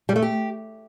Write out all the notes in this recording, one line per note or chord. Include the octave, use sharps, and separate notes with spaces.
G3
A3
G4